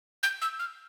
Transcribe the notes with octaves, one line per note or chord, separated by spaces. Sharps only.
G6
E6
F6